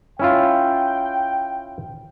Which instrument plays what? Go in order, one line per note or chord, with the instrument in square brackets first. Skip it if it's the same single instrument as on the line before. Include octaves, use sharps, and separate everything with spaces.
[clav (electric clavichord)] C#4 E4 F4 [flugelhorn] G5